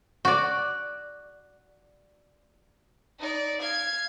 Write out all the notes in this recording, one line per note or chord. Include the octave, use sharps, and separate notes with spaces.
F#4 D5
D#4 D5
F5 G#6